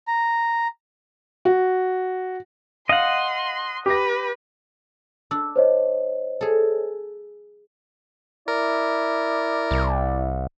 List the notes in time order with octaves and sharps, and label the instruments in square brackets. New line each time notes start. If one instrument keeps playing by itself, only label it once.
[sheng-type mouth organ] A#5
[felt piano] F#4
[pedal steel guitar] D#5 F#5 [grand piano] F5 [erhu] C6
[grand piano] G4 A#6 [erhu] B4
[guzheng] D4 [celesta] E6
[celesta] C5 C#5 D#5
[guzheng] G#4 A4
[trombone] E4 [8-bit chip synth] A#4 [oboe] D5
[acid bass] C2